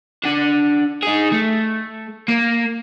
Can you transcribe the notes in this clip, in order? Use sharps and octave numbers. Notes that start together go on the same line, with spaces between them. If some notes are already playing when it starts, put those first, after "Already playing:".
D4 F#5
D#4 G#4
A3
A#3